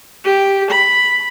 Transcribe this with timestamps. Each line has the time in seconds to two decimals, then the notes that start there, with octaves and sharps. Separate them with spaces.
0.25 G4
0.71 B5